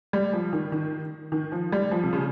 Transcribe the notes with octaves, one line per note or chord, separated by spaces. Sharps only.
G3
F3
D#3
D#3
D#3
F3
G3
F3
C3
C#3